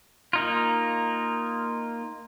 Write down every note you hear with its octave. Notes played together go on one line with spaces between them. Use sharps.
A#3 D#4 F4